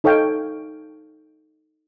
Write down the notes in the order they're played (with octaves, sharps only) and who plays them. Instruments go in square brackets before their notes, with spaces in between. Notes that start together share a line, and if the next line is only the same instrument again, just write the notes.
[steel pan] D#4 A4 C#5 F5 G5